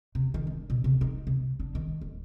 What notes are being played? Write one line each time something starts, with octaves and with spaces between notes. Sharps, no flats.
C3
D#3
D4
B2
C3
D#4
C3
D4
D#3
D1